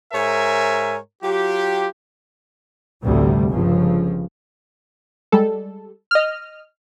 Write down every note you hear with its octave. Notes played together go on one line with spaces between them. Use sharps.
G#2 A#4 C#5 E5 G#5
F#3 F4 G4
A1 D2 C3 G3 A3
G1 C#2 C#3 F3
G3 G#3 A4
D#5 F6